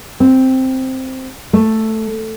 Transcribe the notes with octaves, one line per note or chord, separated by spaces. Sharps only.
C4
A3